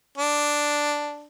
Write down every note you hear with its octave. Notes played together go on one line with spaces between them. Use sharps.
D4